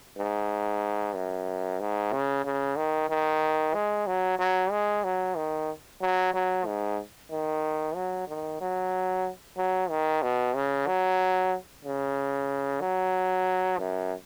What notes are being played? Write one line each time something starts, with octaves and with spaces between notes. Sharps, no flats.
G#2
F#2
G#2
C#3
C#3
D#3
D#3
G#3
F#3
F#3
G#3
F#3
D#3
F#3
F#3
G#2
D#3
F#3
D#3
F#3
F#3
D#3
B2
C#3
F#3
C#3
F#3
F#2